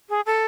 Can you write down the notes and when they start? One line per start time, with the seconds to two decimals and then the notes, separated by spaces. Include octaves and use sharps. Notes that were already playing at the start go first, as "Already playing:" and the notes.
0.09 G#4
0.26 A4